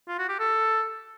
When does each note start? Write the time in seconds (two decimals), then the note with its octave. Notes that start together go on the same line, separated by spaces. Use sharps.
0.08 F4
0.19 F#4
0.29 G4
0.39 A4